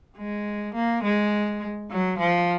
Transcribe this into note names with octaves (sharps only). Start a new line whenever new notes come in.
G#3
A#3
G#3
F#3
F3